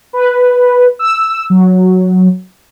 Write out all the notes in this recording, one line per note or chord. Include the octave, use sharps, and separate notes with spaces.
B4
E6
F#3